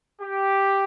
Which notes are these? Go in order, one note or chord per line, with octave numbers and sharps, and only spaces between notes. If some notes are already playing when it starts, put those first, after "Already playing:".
G4